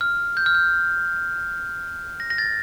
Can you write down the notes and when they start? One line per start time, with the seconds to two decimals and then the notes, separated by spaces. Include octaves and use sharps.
0.01 F6
0.37 G6
0.46 F6
0.55 G6
2.20 A#6
2.30 A#6
2.38 A6